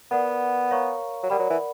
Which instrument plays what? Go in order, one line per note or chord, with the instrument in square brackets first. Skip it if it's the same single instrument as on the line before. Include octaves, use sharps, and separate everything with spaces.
[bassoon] B3 [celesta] A#4 D5 F#5
[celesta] A#4 C#5 F5 A#5 C#6
[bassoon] F#3
[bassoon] G3 [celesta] A#4 D5 F#5 B5
[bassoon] F#3
E3